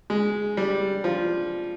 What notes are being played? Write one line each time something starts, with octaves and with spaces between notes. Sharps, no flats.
G#3
G3
F3